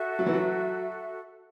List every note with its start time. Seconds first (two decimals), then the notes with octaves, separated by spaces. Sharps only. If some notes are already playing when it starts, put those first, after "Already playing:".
Already playing: F#4 A4 E5
0.19 F#3
0.26 E3
0.34 F#3